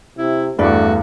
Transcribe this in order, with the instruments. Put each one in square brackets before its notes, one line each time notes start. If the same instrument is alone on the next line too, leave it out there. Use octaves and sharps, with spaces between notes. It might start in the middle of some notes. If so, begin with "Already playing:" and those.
[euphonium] C3 [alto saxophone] E4
[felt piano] E2 G2 [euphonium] A3 [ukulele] D4 B4 D5 [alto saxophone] F#4